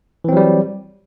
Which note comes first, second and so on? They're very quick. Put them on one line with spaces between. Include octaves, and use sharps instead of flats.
E3 C4 F#3 G3